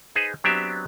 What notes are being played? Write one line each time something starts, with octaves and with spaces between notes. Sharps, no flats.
D#4 G#4 B4 C5
F#3 B3 C4 D4 G4 E5